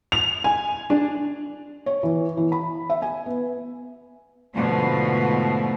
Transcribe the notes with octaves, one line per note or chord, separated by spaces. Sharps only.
F7
G#5
D4
C#5
E3
E3
B5
E5
G#5
B3
G#2 B2 D3 F3 A3